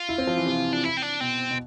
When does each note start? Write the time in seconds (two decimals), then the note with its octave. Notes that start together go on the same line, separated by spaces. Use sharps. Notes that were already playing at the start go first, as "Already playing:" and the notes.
Already playing: F4
0.09 E4
0.18 C4
0.27 F3
0.37 E3
0.46 C3
0.73 D4
0.84 E4
0.97 C4
1.02 D4
1.20 B2 C4
1.51 B2